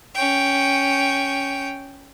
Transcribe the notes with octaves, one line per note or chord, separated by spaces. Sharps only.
C#4 G5